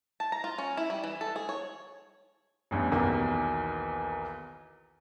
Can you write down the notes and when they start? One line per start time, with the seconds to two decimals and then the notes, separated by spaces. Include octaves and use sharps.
0.20 A5
0.32 A#5
0.44 F4
0.58 C#4
0.77 E4
0.90 G3
1.04 E3
1.21 A4
1.36 G#4
1.49 C#5
2.71 A1 E2 G2
2.92 B1 E2 D#3 A#3